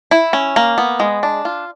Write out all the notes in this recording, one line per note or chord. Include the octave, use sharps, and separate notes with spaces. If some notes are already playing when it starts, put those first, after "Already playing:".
E4
C#4
A#3
B3
G#3
D4
F4